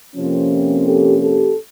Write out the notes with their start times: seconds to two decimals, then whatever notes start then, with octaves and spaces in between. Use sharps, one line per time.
0.15 F2 C3 F3 A#3 C#4
0.85 G4 A4
1.20 G4 A4